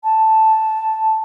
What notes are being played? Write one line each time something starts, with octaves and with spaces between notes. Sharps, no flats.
A5